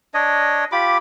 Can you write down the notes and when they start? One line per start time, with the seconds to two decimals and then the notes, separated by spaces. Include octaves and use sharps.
0.14 D4 C#5 D#5
0.72 F4 G4 B5 D6